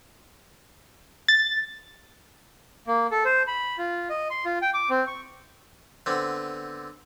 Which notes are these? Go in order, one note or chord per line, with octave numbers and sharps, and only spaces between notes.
A6
A#3
A4
C5
B5
F4
D#5
C6
F4
G5
D6
C4
C#6
D3 B3 C4